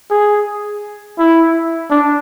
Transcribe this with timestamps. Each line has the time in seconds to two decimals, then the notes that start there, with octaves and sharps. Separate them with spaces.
0.11 G#4
1.19 E4
1.90 D4